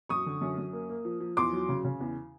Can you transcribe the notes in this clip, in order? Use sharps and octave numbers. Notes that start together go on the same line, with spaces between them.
F#2 C#6 D#6
D3
F#2
F#2
A#3
A#3
F3
F3
E2 C6 D6
F#3
C#3
C#3
E2